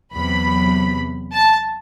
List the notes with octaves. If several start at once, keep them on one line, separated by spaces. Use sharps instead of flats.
E2 C3 F#3 B5
A5